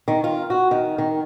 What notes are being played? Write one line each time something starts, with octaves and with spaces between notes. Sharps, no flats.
D#3
F4
F#4
D#3
D#3